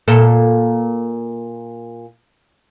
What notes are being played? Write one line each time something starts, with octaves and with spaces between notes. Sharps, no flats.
A#2 A4